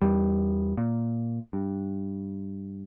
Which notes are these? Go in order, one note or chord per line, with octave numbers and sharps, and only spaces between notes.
E2 G3
A#2
G2